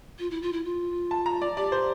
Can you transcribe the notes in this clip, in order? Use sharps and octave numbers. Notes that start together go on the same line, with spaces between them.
F4
E4
F4
E4
F4
A5
A#5
D5
G4 D5
C5